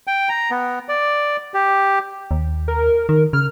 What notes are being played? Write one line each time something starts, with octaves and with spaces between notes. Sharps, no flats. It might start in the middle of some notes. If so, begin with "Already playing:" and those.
G5
A#5
B3
D5
G4
D#2
A#4
D#3 A#4
C#3 F6